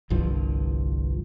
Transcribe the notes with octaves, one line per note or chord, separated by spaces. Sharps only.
G1 C2 G2 F3